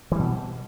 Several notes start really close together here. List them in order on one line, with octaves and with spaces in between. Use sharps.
E3 G3 B2